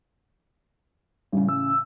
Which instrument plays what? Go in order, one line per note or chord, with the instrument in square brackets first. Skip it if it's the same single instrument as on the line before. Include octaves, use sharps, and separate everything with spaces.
[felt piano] A1 C#3 [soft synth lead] G3
[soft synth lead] E6